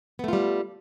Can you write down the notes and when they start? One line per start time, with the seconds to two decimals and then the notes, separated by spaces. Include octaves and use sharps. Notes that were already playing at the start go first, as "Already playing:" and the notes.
0.19 B3
0.24 A3
0.28 F4
0.33 G3